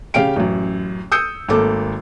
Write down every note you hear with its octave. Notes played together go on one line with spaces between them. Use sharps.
C#3 G4 F5 G5 D7
A1 F#2
D#6 E6 G6 C#7
G#1 A3 A#3 A4 D6